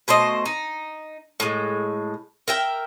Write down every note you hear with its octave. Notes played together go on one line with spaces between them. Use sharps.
B2 A3 C5 D#5
D#4
A2 G#3
A#4 E5 G5